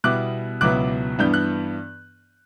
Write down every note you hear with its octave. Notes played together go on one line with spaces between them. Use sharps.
B2 G3 B3 E4 D6 F#6
C#2 B2 F#3 B3 E4 D6 F#6
G2 E3 B3 D4 G6
F#6